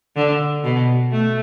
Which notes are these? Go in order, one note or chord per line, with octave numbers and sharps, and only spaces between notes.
D3
B2
A3